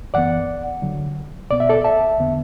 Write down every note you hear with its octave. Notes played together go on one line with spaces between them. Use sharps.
F#2 E3 B3 D5 F#5
D2 D3 F#3
B2 B3 D5
E5
A4 D5
E5 A5
E2 D3 B3